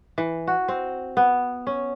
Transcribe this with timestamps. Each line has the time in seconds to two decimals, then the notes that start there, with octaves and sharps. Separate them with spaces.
0.18 E3
0.47 F#4
0.68 C4
1.17 B3
1.67 C#4